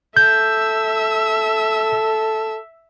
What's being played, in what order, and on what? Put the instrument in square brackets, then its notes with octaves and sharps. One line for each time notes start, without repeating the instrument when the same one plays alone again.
[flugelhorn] A4 [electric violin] E5 E6 [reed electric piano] G6